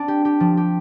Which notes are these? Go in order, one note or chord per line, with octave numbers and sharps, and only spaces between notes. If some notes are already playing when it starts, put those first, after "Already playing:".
Already playing: C4 D4
G4
G4
F3
G4